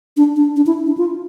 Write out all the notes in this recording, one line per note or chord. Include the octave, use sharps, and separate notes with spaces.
D4
D4
D4
E4
D4
F4